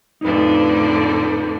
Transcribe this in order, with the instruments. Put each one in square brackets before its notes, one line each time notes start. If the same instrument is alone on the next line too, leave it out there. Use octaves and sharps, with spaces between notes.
[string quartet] F2 A2 D3 [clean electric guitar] D#4 B4